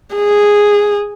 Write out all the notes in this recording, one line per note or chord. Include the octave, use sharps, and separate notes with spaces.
G#4